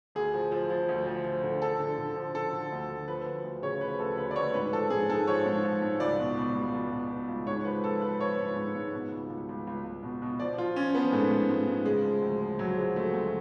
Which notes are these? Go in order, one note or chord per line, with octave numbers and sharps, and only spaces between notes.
D2 G#4
F3
F3
F3
D2
F3
F3
D3
F3 A4
D3
D3
F3
D3 A4
D3
D2
D2
F3 B4
D2
D2
C#3 C#5
F3 B4
D2 A4
D2 B4
D5
D2 C#5
G#2 B4
F3 A4
G#2 G#4
G#2 A4
F3 C#5
G#2
F3
G#2
C#2 D5
B2
B2
C#2
C#2
B2
B2
C#2
G#2 C#5
F3 B4
F3 A4
F3 B4
F3 C#5
G#2
G#2
G#2
B2
C#2
C#2
C#2
C#2
C#2
B2
B2
F3 D5
F3 F4
F3 C#4
F3 B3
G#2 A3
G#2
G#2
G#2
C#3 G#3
F3
D2
F3
D2 F#3
F3 G#3
C#3 A3
D2 A3